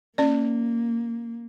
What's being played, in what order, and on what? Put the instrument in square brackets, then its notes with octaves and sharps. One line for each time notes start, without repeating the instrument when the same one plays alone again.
[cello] A#3 [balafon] C#4 D5